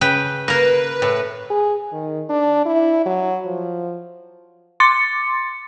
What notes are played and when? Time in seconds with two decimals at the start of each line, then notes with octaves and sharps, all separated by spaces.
0.01 C#3 B4 G5
0.48 A#3 A#4 B4
1.02 A2
1.50 G#4
1.93 D#3
2.30 D4
2.66 E4
3.06 F#3
3.46 F3
4.80 C6 D6 A6 C#7